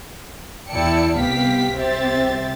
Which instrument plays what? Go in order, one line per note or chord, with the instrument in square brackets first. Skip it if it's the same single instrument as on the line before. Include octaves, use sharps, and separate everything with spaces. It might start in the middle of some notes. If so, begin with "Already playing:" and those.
[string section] E2 E4 D5 G5 A5 C#7
C2 C3 B3 G4 F5 B6
C2 C4 G4 C5 E5 A6